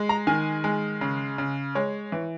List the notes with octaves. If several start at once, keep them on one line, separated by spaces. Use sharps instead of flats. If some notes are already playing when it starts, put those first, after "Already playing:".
Already playing: G#3
A#5
D#3 G#5
G#3
C#3
C#3
G#3 C#5
E3